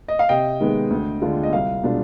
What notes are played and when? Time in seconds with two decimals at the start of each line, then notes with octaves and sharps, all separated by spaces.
0.08 D#5
0.19 F5
0.29 C3 D#5 G5
0.60 D#3 G#3 B3
0.90 D2
1.22 D3 G#3 D4 F4
1.43 D#5
1.52 C2 F5
1.83 B2 G#3 D4 F4